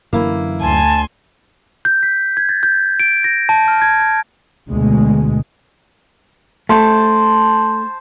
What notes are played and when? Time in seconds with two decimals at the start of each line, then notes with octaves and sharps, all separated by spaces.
0.13 F#2 D3 E3 A#3 E4
0.61 D2 G#5 A5 C6
1.85 G6
2.03 B6
2.37 G#6
2.49 A6
2.63 G6
3.00 D7
3.24 A#6
3.49 A5
3.68 F6
3.82 G#6
4.00 G#6
4.68 D2 B2 G#3
6.69 A3 C5 A5